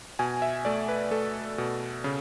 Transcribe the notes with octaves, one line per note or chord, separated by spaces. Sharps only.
B2 G#5
E5
A3 D5
B4
A3 A4
B2
C#3